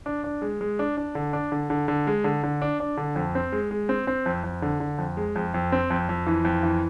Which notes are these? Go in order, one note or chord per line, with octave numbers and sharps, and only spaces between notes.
D4
D4
G#3
G#3
D4
D4
D3
D4
D3
D3
D3
G#3
D3
D3
D4
D4
D3
F2
C4
G#3
G#3
C4
C4
F2
F2
D3
D3
F2
G#3
F2
F2
C4
F2
F2
E3
F2
E3